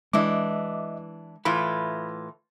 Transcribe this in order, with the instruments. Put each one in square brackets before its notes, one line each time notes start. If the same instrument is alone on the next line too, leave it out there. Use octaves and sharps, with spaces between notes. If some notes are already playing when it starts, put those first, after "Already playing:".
[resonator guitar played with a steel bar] E3 D4 [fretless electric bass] G#3 [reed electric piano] D#5 E5 D6
[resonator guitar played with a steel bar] A2 E3 F4 [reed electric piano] B5